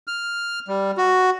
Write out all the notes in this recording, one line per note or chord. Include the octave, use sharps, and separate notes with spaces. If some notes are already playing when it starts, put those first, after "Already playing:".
F6
G3
F#4